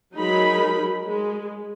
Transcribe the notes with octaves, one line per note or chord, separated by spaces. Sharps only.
F#3 G#3 D#4 G#4 A#4 B5
G#3